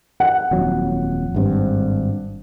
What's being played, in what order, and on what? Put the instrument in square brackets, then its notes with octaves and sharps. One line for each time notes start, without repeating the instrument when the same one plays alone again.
[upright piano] F#5
[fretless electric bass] D#1 F2 F#3
G#1 G2 C4